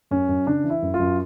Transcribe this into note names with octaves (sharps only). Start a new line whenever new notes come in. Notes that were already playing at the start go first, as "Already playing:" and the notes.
F#2 C#4
F#2
C#3 D4
E3
E4
F#2
F4
F#2